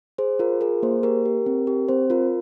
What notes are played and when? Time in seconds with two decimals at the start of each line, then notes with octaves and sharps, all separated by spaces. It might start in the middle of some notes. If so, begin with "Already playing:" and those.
0.18 G#4 C5
0.39 F4 A#4
0.61 G#4 A#4
0.83 A#3 C5
1.03 G4 A#4
1.25 G4
1.46 C4
1.67 G4
1.89 C4 C5
2.10 F4 A#4